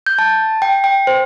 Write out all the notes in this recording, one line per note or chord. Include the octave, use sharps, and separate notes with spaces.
G6
A5
G5
G5
C5